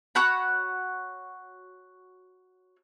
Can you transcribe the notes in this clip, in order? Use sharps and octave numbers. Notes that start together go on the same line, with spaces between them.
F#4 C#5 F#5 B5